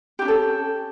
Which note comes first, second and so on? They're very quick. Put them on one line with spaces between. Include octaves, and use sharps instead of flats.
G4 D#4 C#4 A4